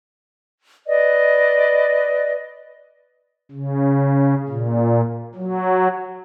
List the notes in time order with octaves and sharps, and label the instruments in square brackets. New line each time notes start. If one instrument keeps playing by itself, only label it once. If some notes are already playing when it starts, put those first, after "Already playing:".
[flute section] B4 D5 D#5
[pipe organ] C#3
A#2
F#3